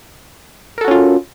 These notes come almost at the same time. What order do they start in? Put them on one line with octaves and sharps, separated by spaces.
A#4 A4 F#4 C#4 F4